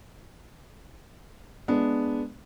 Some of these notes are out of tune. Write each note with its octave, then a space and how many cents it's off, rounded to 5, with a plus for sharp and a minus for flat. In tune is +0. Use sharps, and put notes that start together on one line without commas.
G#3 +10 B3 +0 D4 +0